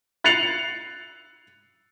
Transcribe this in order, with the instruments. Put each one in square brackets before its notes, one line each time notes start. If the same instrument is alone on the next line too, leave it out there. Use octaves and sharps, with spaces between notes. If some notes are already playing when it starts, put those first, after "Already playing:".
[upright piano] F#6 A6 C7 C#7 F7 F#7